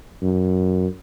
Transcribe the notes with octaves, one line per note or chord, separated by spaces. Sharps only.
F#2